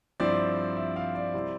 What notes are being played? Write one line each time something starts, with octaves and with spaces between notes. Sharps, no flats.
G2 F3 C4 E4 D5
E5
F5
D5
C3 G3 C4 E4